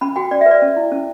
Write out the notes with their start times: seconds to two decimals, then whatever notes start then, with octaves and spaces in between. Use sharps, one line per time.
0.01 C#4 B5
0.16 F#4 G5
0.31 C#4 D5
0.41 E5
0.46 B4
0.51 D5
0.62 C#4
0.76 E4
0.92 C#4